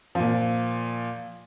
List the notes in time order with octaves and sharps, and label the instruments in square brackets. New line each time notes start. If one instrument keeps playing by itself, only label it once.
[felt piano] A#2 F3